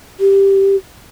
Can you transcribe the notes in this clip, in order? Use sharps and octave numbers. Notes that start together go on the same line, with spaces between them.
G4